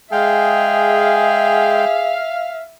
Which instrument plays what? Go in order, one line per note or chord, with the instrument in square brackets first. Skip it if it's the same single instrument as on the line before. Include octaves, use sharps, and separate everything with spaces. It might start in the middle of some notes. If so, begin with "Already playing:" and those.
[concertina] G#3 G5 [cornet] G#4 [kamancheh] E5 [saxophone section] F5